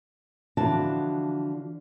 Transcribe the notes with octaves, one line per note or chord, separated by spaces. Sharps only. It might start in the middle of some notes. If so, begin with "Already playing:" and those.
D3 E3 F3 D4 F#4 A5